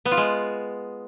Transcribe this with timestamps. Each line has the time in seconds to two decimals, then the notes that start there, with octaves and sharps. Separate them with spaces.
0.05 B3
0.11 F4
0.17 G#3